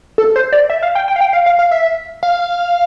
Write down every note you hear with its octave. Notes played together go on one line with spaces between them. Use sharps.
A4
C5
D5
E5
F5
G5
G5
F5
G5
F5
F5
F5
E5
F5